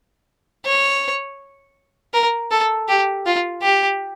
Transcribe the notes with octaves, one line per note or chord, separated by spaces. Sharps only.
C#5
A#4
A4
G4
F4
G4